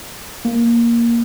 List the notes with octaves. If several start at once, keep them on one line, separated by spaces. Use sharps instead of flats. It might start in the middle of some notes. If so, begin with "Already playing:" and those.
A#3